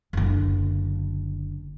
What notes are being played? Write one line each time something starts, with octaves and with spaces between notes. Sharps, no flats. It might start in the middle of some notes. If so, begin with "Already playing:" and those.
F#1 D3